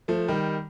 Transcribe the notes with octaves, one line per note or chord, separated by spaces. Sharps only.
F3 A3
D#3 G3